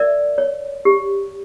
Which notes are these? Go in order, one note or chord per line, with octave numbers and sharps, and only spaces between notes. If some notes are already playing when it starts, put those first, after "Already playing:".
Already playing: A#4 D5 E5
C#5
G4